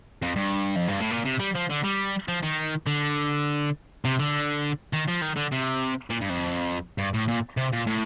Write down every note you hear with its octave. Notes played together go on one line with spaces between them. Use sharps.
F2
G2
F2
G2
A2
A#2
C3
G3
F3
D3
G3
F3
D#3
D3
C3
D3
D#3
F3
D#3
D3
C3
A#2
G2
F2
G2
A2
A#2
C3
A#2
A2